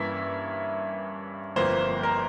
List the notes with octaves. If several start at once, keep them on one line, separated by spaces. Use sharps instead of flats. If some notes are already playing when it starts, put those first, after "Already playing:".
Already playing: G2 E3 A#3 C#4 E5
G1 F2 E3 A#3 C5
A#4